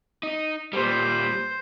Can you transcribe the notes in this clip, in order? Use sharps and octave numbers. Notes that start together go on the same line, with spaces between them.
D#4
A#2 G3 C5